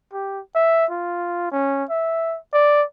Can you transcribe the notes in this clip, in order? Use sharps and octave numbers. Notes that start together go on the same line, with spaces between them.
G4
E5
F4
C#4
E5
D5